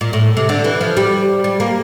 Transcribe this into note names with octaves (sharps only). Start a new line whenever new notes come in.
A#2
A2
C3
D3
E3
F3
G3
G3
A#3